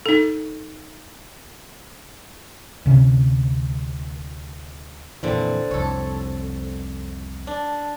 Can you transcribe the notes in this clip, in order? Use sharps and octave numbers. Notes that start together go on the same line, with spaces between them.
D#4 A4
D2 C3 C#4
F2 A#2 D3 E3 C4
C2 F2 A4 C#5
D4